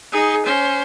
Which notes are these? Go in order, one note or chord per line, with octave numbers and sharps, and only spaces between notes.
D#4 G#4
C#4 C5